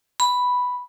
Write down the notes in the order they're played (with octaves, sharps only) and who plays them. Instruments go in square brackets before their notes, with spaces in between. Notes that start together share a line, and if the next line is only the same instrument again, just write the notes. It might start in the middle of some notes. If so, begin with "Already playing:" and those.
[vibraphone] B5